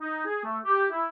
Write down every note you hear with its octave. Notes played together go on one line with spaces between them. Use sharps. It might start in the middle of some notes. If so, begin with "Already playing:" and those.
D#4
G#4
A3
G4
E4